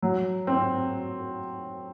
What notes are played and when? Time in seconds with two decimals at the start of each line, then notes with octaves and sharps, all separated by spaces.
0.03 F#3
0.47 C4